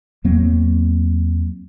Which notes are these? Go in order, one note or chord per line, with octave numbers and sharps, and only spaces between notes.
E2 F#3 A#3 C4